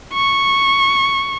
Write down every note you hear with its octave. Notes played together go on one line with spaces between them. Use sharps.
C#6